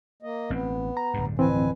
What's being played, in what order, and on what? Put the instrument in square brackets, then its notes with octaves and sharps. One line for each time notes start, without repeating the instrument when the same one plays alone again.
[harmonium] A#3 D#5
[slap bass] A1 C4 [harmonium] B3
[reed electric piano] A#5
[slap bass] D1 G2
[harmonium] F2 B4 G#5 [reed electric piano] E3 C4